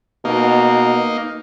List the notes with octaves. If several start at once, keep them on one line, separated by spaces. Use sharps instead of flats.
B2 A#3 D#4